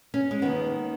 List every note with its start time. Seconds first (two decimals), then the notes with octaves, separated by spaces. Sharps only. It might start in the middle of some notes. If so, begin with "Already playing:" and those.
0.14 C#4
0.31 G#3
0.42 D#2 D#3 B3